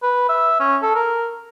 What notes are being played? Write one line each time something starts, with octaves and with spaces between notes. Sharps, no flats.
B4
E5
C#4
A4
A#4